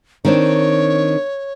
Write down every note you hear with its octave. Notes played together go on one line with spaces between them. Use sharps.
D#3 C4 D4 C#5